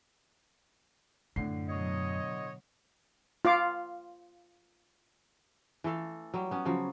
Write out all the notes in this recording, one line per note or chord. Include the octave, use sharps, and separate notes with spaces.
F#2 A2 D3 C7
B2 F#3 C#5 D#5
F4 F5 D6
E3 A3 A4 F5
F#3 G3
B3 C#4
C#3 F3 F#3